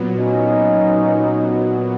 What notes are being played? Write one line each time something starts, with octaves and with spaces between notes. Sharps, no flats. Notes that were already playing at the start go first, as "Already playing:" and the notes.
Already playing: A#2 F#3 B3
C#4 D#4